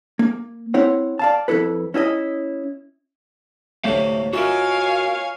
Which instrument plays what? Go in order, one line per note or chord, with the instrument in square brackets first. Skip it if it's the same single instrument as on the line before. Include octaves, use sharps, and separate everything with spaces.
[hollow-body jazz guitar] A#3
C4 E4 C#5 F#5
D5 F5 A5
F2 G#3 E4 A4 B4
C#4 E4 G#4 D#5
[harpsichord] D2 A2 C3 [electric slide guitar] A3 E5 F5
[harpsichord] D#4 F4 E5 [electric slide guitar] F#4 A#4 [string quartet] C#5 F5 G#5